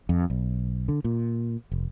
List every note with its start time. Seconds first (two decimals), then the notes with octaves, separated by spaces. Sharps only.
0.09 F2
0.30 B1
0.88 D3
1.04 A#2
1.71 F1